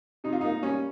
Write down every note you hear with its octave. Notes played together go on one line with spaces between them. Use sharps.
C3 D#4
F4
A#3 D#4
G3 C#4